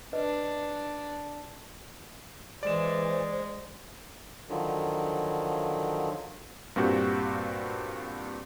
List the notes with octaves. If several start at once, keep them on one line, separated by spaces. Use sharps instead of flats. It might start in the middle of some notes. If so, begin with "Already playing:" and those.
D4 B4 D5 D#5
E3 G#3 C5 D5 E7
D3 D#3 F3 F#3
G2 A#2 C4 F#4 G4